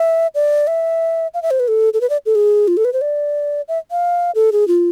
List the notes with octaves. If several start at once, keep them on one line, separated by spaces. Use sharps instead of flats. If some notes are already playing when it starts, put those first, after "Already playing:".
Already playing: E5
D5
E5
F5
E5
C5
B4
A4
A4
B4
D5
A4
G#4
F4
A4
B4
C5
D5
E5
F5
A4
G#4
F4